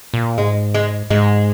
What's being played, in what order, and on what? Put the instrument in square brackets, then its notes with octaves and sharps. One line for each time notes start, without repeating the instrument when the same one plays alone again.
[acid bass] A#2
[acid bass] G#2 [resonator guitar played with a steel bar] G#3
[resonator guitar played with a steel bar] G#3
[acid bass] G#2 [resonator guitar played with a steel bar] G#3